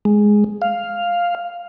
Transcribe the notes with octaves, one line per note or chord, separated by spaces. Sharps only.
G#3
F5